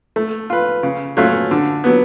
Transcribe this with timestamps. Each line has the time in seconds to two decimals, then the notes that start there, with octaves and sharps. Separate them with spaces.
0.16 A3
0.50 F4 B4
0.83 C#3
1.17 F#3 A3 C#4 F4
1.51 D3
1.84 F#3 B3